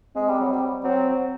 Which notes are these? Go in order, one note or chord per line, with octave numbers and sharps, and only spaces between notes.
G#3 C4
G3
F#3
G3
F#3 C4